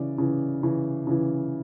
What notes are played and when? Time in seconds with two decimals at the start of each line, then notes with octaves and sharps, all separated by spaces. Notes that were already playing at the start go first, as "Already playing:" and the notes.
Already playing: C#3 E3 D5
0.18 C#3 E3
0.63 C#3 E3
1.07 C#3 E3